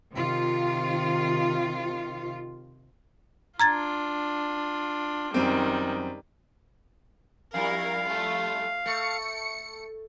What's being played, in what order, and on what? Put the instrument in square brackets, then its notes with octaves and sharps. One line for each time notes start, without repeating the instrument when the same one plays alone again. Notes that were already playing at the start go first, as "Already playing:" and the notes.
[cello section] C3 D#3 F4
[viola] D4 F4 [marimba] A#5 G#6 A6
[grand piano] F#2 C4 [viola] D#3 G3
[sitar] F2 G3 E4 [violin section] A#4 [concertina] F5
[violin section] A3 F4
[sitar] A3 [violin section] C#7